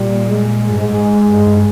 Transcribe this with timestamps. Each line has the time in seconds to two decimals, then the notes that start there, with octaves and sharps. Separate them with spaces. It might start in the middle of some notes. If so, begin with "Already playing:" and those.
Already playing: A#2 G3
0.28 G#3
0.70 G2
0.78 G#2 G#3
1.30 G2
1.46 G2